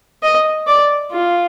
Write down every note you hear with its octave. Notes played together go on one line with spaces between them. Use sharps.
D#5
D5
F4